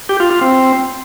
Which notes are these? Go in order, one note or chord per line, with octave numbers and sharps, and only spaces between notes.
G4
F4
F4
C4